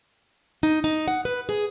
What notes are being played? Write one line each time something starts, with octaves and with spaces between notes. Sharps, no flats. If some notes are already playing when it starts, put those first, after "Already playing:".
D#4
D#4
F#5
B4
G#4